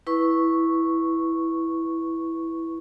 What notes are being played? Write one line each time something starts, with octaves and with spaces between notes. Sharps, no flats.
E4 B4 C#6